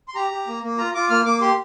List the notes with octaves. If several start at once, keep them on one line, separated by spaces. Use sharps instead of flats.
C6
G4 A#5
G4
A#3
A#3
F4 A#5
F4 D6
A#3 F6
A#3 D6
G4 C6